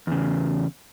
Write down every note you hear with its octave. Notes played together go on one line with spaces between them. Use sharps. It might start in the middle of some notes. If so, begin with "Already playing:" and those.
E2 C#3